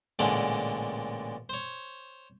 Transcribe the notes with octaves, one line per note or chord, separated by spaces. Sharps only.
A1 A#2 D3 G#3
C5 C#5